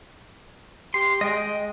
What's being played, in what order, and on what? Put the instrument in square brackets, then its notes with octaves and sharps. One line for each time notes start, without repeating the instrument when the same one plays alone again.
[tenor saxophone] G4 [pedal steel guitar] C6
[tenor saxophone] G#3 [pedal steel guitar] D#5 G5